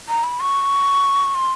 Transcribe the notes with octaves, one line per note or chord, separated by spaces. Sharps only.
A#5
B5
C#6
C6